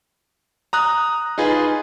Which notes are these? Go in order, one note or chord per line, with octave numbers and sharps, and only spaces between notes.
A#5 D#6 F#6
D#4 F4 G#4 B4